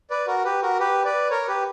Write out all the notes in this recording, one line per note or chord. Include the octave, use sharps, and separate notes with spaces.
B4 D5
F#4 A#4
G4 B4
F#4 A#4
G4 B4
B4 D5
A#4 C#5
G4 B4